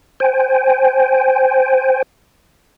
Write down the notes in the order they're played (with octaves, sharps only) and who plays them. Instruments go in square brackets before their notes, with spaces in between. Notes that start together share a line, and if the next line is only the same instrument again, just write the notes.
[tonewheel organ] C5 G5 G#5